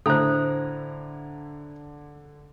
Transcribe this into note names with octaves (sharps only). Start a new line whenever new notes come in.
A2 D3 A4 C5 A#5